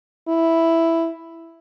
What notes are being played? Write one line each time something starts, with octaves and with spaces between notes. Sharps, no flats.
E4